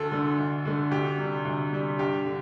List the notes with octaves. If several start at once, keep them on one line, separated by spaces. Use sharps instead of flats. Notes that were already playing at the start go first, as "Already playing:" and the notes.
Already playing: D2 A4
D3 A3
D2
D3 A3
D2 G4
C3 G3
D2
C3 G3
G2 G4
D3